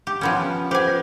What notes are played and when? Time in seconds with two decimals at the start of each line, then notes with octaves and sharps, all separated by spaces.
0.07 G4
0.21 F3 B3 C#4
0.71 G4 B4 C5 F#5 G#5
0.88 F4